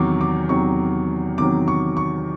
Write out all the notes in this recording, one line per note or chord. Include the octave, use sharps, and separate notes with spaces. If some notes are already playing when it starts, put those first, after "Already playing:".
Already playing: E2 C3 D#3 F#3 C#6 D6
D6
E2 C3 D#3 F#3 C#6
E2 C3 D#3 F#3 D6
C#6
C#6